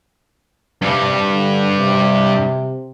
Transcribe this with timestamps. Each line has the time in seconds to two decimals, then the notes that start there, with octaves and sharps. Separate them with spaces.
0.82 G2 C3 G3
1.31 D3
1.77 C3